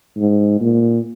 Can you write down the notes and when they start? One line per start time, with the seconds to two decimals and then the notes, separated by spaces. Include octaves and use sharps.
0.17 G#2
0.60 A#2